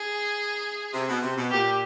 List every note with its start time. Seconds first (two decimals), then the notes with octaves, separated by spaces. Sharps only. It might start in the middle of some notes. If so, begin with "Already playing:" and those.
Already playing: G#4
0.93 C3
1.08 B2
1.21 C3
1.37 B2
1.50 A#2 G4